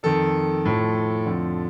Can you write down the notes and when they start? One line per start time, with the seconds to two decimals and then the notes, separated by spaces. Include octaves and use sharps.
0.03 F2 D#3 A4
0.65 A2 F3
1.26 F2 D3 F3